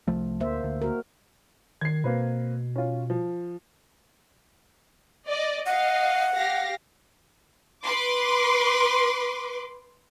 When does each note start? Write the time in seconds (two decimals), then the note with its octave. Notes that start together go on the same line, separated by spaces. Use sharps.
0.08 C2 F3 A3
0.40 D2 A#3 C5 E5
0.63 D2
0.82 A#3 F#4 A#4
1.81 D#3 G#6 C7
2.04 B2 A#3 C4 B4
2.76 C#4 F4
3.10 F3
5.28 D5 D#5
5.66 D#5 F5 F#5
6.35 G4 F5 A#6
7.84 B4 C6 D6